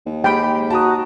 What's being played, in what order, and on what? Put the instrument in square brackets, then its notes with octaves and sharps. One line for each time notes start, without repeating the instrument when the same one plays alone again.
[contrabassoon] D#2
[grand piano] G#3 G4 B5 [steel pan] G5
[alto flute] F#4 [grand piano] A5 A#5 D#6